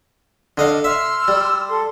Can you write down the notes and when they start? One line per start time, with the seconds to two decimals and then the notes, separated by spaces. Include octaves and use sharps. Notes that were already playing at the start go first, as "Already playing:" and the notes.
0.57 D3 D#5 F5
0.84 E5 C6 E6 F6
1.28 G3
1.68 A4 C6